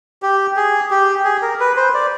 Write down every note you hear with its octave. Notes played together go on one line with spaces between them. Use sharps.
G4
G#4
G4
G#4
A#4
B4
C5
D5